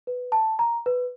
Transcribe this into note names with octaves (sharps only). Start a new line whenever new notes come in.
B4
A5
A#5
B4